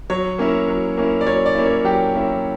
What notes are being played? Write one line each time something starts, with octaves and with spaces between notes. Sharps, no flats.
F#3 C#5
A#3 C#4 E4
F#3
A#3 C#4 E4
D5
F#3 C#5
D5
A#3 C#4 E4
C#5
F#3 G4
A#3 C#4 E4